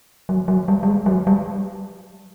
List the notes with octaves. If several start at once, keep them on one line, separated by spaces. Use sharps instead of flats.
F#3
F#3
G3
G3
G#3
F#3
G3